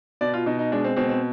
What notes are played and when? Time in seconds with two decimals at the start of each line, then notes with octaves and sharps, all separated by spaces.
0.21 B2 D5
0.34 F4
0.46 B2 D#4
0.59 D#4
0.72 G#3 D4
0.84 C4
0.96 B2 C4
1.09 C4